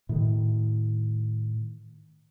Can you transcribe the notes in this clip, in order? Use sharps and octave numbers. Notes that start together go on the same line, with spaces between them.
A2 D#3